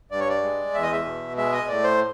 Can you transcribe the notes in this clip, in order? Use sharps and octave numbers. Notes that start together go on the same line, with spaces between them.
G2 D5
C#5
D5
G#3
E2 E5
D#5
E5
B2
G#3 E5
D#5
A2 D5
C5